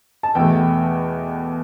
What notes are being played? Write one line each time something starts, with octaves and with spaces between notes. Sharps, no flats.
A5
E2 B2 A3 G5